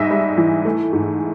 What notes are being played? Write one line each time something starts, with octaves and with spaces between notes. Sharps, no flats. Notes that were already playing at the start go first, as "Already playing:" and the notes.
Already playing: G#2 G3 D#5 E5
G3
E3
A3
G#2